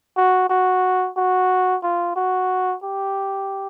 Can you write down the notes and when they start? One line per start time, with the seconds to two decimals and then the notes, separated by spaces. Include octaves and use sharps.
0.17 F#4
0.50 F#4
1.17 F#4
1.83 F4
2.16 F#4
2.83 G4